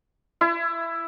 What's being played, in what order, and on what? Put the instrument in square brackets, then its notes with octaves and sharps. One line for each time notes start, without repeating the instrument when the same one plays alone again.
[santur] E4